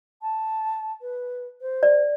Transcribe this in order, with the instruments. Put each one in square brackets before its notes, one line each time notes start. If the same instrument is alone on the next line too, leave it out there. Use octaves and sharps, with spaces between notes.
[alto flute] A5
B4
C5
[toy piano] D5